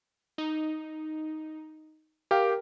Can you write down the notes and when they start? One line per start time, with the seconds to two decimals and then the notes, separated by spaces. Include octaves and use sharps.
0.38 D#4
2.31 G4 A#4 F5 G5